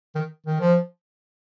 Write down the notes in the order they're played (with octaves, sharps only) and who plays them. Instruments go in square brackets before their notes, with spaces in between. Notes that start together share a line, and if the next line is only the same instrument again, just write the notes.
[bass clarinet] D#3
D#3
F3